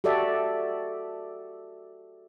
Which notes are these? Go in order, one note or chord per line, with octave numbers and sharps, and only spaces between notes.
F#4 G4 A4 D5 E5